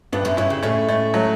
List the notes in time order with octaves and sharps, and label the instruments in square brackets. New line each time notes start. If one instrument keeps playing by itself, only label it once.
[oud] G2 [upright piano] B3 D4
[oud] F#2
[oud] G2 [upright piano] C#4 E4
[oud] C#3
[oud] A2 [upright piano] A3 C#4
[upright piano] A3 C#4
F#3 A3